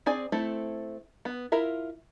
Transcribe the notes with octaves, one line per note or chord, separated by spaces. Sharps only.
C4 G#4 D5 G#5
A3 C4 E4 A4
B3
E4 F4 A#4 E5